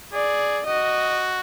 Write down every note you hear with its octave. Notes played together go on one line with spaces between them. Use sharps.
G#4 D5
F#4 D#5